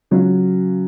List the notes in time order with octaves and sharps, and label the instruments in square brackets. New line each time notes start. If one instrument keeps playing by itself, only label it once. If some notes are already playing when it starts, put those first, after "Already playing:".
[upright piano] C#3 F#3 C#4 F4